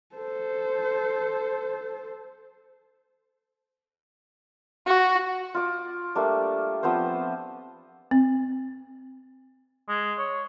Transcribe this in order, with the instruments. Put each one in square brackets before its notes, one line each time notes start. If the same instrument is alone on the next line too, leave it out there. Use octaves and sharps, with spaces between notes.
[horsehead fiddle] A4 C5
[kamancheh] F#4
[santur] F4 D6
G3 A3 A#3 D4
F3 B3 C4 C5
[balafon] C4
[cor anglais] G#3
C#5